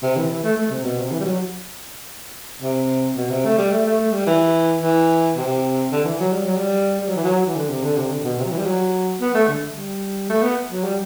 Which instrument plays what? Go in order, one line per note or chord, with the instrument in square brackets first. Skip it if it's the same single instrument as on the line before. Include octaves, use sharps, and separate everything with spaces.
[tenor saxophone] C3
E3
E3
A3
A3
C3
B2
C3
E3
G3
F#3
C3
B2
C3
A3
G3
A3
A3
A3
G3
E3
E3
C3
D3
E3
F#3
G3
F#3
G3
G3
F#3
E3
F#3
E3
D3
C3
D3
C3
D3
B2
C3
F#3
E3
G3
F#3
B3
A3
D3
G3
A3
B3
F#3
G3